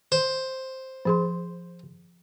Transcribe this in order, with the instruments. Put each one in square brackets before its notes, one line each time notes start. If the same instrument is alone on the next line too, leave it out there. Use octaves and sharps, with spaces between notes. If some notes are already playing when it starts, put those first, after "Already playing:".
[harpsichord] C5
[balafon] F3 G#4 C6